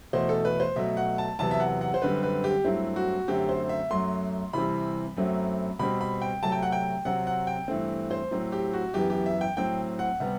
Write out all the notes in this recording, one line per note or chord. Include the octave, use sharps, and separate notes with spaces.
E2 B2 A3 C5
A4
B4
C5
B2 F#3 A3 E5
F#5
A5
E2 C3 F#3 B3 A5
E5
F#5
F#5
C5
F#2 D3 G3 C4 B4
B4
G4
G2 F#3 A3 C4 E4
F#4
F#2 D3 F#3 A3 C4 G4
C5
E5
F#2 F#3 A3 C6
C3 E3 G3 C4 B5
F#2 F#3 A3 C4
B2 G3 C4 B5
B5
G5
C3 F#3 A3 A5
G5
F#5
G5
C3 F#3 C4 F#5
F#5
G5
G2 E3 A3 C4
C5
A2 F#3 C4
G4
F#4
F#2 E3 B3 G4
G4
E5
G5
A2 F#3 C4 G5
F#5
C3 G3 B3